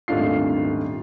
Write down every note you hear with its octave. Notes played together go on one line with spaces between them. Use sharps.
D#1 G#1 A3 D4 F4 C7